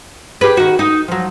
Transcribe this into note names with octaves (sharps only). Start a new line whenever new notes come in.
G4 G#4 B4
D#3 F#4
D#4
F3 F#3